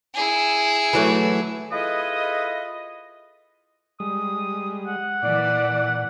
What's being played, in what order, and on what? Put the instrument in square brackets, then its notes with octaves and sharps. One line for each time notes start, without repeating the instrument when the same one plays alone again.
[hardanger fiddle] E4 G#4
[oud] E3 F#3 A3
[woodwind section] E4 F4 G#4 A4 B4 D#5
[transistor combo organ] G3 G#3 [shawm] D#6
[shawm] F#5
[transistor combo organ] A#2 [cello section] E3 D5